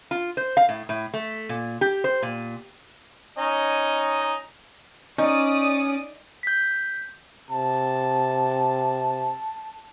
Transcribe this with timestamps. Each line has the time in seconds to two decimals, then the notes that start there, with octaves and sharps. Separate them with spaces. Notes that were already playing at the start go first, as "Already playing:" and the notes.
0.11 F4
0.37 C5
0.57 F5
0.69 A2
0.89 A2
1.14 A3
1.49 A#2
1.81 G4
2.04 C5
2.23 A#2
3.38 C#4 D#4 D#5
5.18 C#4 D#4 D5 D#6
6.43 G6 B6
7.51 C3 A5